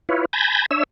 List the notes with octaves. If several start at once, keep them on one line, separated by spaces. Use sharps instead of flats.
E4 F4 B4 C#5
G#5 A5 B5 G6 G#6 A#6
D4 C#5 E5 E6